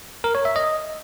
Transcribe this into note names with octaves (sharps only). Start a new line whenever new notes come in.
A#4
C#5
E5
D#5